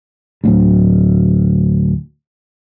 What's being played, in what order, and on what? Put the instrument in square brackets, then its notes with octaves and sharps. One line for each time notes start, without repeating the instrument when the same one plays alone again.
[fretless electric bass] D1 D2